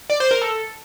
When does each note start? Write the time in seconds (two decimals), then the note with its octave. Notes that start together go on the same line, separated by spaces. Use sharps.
0.10 D5
0.20 C5
0.31 A#4
0.42 A4